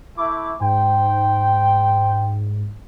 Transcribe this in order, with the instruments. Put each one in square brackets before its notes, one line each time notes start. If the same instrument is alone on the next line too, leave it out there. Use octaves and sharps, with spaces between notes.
[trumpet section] A3 E4 [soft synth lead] D6
[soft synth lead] G#2 [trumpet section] C5 G5